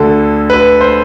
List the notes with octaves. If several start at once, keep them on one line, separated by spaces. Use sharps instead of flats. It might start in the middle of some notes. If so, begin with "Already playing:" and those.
Already playing: D2 D3 A4
B4
C5